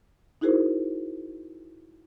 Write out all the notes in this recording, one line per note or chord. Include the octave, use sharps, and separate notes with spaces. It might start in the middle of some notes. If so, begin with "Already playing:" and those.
D#4 E4 F#4 G#4 A#4 C5